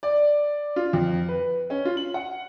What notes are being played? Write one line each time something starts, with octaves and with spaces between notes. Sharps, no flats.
D5
F4
F2
B4
C#4
F4
F#7
F#5